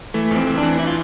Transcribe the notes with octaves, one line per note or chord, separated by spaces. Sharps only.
E3 A3
F2
C4
E3
D4
E3
E3 E4
F4